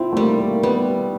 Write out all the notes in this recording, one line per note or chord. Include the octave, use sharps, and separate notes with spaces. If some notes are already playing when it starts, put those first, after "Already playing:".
Already playing: C4 E4 F4
A3
G3 A#3
A#3
G3 B3